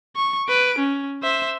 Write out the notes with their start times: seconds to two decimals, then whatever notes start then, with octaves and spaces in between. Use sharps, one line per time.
0.16 C#6
0.48 B4 D7
0.79 C#4
1.23 C5 E5